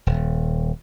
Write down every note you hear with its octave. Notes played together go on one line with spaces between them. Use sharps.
D#1